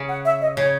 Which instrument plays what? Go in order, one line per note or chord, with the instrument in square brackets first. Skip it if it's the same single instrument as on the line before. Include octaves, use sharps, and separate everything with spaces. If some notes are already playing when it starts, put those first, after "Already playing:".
Already playing: [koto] C#3
[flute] F#5
E5
D#5
[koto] C#3 [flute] C#5